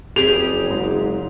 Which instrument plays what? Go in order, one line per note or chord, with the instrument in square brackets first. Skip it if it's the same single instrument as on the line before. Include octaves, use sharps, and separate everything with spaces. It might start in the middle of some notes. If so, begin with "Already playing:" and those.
[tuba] F#1 [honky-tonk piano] F2 [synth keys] G4 G#4 [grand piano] F7
[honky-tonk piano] G#2